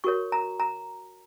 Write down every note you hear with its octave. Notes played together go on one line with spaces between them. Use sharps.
F#4 A#4 C#5 C#6
A#5
A#5